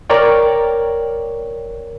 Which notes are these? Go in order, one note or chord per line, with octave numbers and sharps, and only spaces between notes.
A#4 C#5 D5 G5